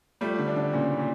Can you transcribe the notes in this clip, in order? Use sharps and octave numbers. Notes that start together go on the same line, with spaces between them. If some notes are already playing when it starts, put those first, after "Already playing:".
F3 G3 A3
D3
D4
D3
A#2 C#3 E3
A#2